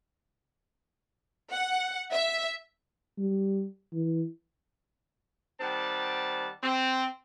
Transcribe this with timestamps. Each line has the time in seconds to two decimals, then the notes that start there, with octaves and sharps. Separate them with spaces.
1.52 F#5
2.12 E5
3.18 G3
3.93 E3
5.61 D#3 G3 C4 F#5 A5
6.63 C4